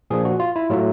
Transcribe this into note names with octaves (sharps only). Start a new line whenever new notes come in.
A#2 F3 A#3 D4 G#4
F#4
F4
E4
A2 F#3 A3 F4